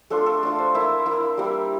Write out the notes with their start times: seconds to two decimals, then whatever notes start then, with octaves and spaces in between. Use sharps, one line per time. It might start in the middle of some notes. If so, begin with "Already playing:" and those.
0.10 A3 D4 F4 A4
0.26 A4
0.43 A3 D4 F4
0.59 C5
0.75 A#3 E4 E5
1.06 A#3 E4
1.38 G3 A#3 E4